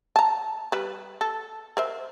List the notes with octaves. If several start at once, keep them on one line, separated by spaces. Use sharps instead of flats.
A5 A#5
G3 B4
A4
A#4 C5 E5